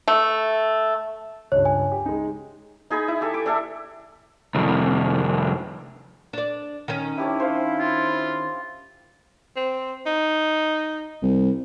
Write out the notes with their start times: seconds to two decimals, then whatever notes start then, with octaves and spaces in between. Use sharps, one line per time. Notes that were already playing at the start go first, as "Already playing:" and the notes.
0.08 A3
1.52 C#2 G2 C#5
1.65 G#5
1.92 G4
2.06 G#3 D#4
2.90 D#4 G#4 G#5 B5
3.08 E4
3.21 G4 A4 G#5
3.34 D6
3.46 D4 A4 E5
4.55 C2 F2
6.33 D4 D5
6.88 D#3 C#4
7.18 D4 E4 G4 C#5
7.40 C5 F5
7.79 F4
9.56 C4
10.06 D#4
11.22 C2